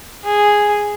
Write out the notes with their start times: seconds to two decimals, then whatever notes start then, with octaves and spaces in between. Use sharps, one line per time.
0.24 G#4